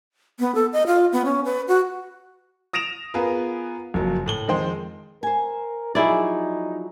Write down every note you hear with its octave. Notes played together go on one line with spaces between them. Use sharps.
B3
A4
D#5
F4
B3
C#4
B4
F#4
D#6 A#6 D7 E7 F7
B3 F4 G#4 A#4 B4
F#1 F2 F#3
A2 F#7 G7
F2 D#3 G#3 C5 G5
A#4 C5 G#5
F3 F#3 D#4 E4 G#4 D5